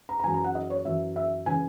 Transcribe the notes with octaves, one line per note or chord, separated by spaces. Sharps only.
A#5
A#5
F#2 E3 G#5
A#5
F#5
D#5
C#5
F#2 E3 E5
E5
C#3 E3 G#5